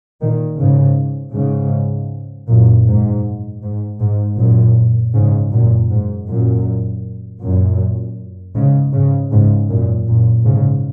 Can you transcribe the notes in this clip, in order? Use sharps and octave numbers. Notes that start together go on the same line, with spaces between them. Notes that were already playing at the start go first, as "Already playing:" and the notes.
A#2 D#3
G#2 C#3
G#2 C#3
F#2 A#2
G#2
G#2
G#2
F#2 A#2
G#2 C#3
F#2 A#2
G#2
F#2 A#2
F#2 A#2
G#2 C#3
G#2 C#3
G#2 C#3
F#2 A#2
F#2 A#2
G#2 C#3